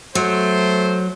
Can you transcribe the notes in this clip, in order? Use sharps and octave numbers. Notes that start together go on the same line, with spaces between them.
F#3 A3 C5